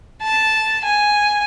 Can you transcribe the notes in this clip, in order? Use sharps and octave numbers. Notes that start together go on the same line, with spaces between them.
A5
G#5